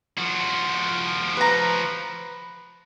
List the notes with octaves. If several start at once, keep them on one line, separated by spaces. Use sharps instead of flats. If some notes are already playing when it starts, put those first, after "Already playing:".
F3 F#4
B4 A#5